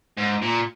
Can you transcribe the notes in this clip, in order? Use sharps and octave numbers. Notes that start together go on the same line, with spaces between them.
G#2
A#2